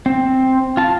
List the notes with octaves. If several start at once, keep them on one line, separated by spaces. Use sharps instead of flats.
C4
F4 A5